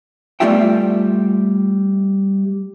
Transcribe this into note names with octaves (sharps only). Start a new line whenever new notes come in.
G3 A3 B3 F4 E5 G5